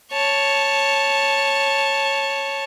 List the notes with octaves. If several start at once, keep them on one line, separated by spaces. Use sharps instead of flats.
C#5 A5